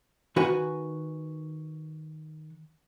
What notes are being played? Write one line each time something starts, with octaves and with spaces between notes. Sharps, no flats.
D#3 F#4 B4 G#5